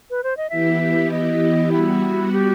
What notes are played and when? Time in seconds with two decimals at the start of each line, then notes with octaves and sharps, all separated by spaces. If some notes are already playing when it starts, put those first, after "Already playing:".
0.10 B4
0.23 C5
0.37 D#5
0.50 E3 B3 E4 G4 E5
1.11 D#5
1.72 G3 B3 E4 F#4
2.32 G4